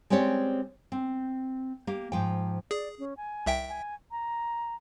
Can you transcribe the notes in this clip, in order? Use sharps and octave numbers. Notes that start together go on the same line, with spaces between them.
G#3 C4 C#4 G4 C#5 D5
C4
A#3 G4
G#2 F3 G5
G#4 D5
C#4
G#5
C2 E5 G5
G#5
A#5